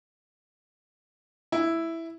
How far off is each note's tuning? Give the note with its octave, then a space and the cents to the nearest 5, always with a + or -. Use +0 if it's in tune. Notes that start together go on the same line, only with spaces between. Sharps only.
E4 +0